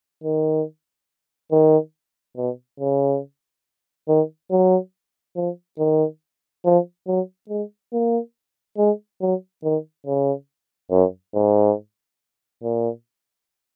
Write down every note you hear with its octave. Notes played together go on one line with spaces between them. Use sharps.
D#3
D#3
B2
C#3
D#3
F#3
F3
D#3
F3
F#3
G#3
A#3
G#3
F#3
D#3
C#3
F#2
G#2
A#2